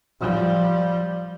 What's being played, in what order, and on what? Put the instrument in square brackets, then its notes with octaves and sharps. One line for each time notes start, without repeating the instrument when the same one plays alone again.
[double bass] F3 G3